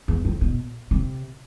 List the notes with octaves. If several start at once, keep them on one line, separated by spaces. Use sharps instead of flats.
E2
F2
B2
C3